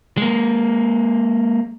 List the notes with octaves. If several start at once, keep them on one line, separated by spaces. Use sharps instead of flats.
G#3 A#3